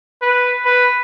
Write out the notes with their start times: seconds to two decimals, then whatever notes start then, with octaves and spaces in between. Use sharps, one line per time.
0.22 B4
0.65 B4